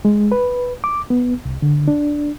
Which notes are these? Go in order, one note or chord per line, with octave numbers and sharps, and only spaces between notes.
G#3
B4
D6
B3
C2
D3
D4